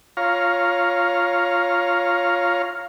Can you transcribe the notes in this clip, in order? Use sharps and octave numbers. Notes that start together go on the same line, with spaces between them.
F4 C#5 F5 A#5